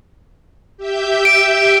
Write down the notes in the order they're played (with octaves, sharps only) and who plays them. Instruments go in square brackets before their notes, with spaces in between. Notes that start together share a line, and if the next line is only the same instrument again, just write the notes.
[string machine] G4 E5 G6
[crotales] D7